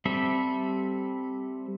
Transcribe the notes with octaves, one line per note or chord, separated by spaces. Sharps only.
G3 C4 A4 E5